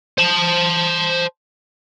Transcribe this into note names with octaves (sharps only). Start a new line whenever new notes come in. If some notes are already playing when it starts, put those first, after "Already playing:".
C5 A5